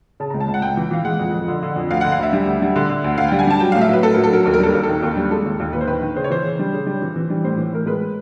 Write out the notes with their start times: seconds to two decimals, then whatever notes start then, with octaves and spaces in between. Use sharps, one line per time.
0.20 C#3 A5
0.30 C#2 A#5
0.40 A5
0.48 C#2
0.54 F#5
0.62 C#2 G5
0.77 E3
0.91 E3 F5
1.05 G#3 F#5
1.20 F2
1.34 F2
1.48 D3
1.63 D3
1.76 F2
1.91 D2 F5
2.01 D3 F#5
2.12 F5
2.19 D2 E5
2.33 G3
2.47 D2
2.62 G3
2.76 D3
2.89 D3
3.04 D2
3.18 D2 F5
3.28 G3 G5
3.39 G#5
3.47 G3 A5
3.60 F#3 G5
3.72 A2 F5
3.81 E5
3.89 F#3 B4
4.03 A2 A4
4.13 F#3 A#4
4.24 A4
4.32 F#3 A#4
4.43 D#2 A4
4.54 A#4
4.59 G3 A4
4.73 D#2 A#4
4.83 A4
4.89 D#3
5.03 D#2
5.17 G3
5.30 G#3 A4
5.46 D#2
5.60 D#2
5.73 D#2 B4
5.81 C5
5.87 D#3 B4
6.02 D#3
6.16 C#3 C5
6.24 C#5
6.30 E3 C5
6.44 C#3
6.59 G3
6.73 C#3
6.87 G3
7.02 E3
7.16 E3
7.30 G3
7.44 A2 C5
7.57 E3
7.73 A2 A#4
7.86 G#3 B4